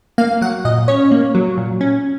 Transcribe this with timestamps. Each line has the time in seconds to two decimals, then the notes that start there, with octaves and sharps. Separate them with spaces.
0.18 A#3 F5
0.41 F#3 F#5
0.65 A#2 D#5
0.88 C#4 C#5
1.11 A#3
1.35 F#3
1.58 A#2
1.81 C#4